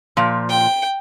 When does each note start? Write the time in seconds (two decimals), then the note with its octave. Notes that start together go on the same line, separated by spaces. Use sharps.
0.17 A#2 F3
0.49 G5